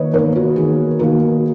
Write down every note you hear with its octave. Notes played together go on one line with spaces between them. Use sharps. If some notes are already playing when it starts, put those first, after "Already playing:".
Already playing: D#3 A#3 B4 C#5 D#5
D#3 A#3 A#4 C#5
F#4
D#3 A#3 G#4
D#3 A#3 F#4 A#4